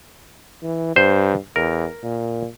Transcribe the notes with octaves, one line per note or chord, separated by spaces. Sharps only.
E3
G2 C5
E2 A#4
A#2